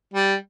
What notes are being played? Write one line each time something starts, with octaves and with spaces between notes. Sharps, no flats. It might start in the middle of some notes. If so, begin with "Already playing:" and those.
G3